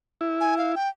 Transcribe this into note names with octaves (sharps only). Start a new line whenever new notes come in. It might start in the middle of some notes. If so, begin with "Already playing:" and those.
E4
G#5
F5
G5